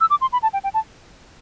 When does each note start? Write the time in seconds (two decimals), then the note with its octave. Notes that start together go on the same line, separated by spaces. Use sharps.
0.01 E6
0.10 D6
0.21 C6
0.33 B5
0.43 A5
0.53 G5
0.64 G5
0.74 A5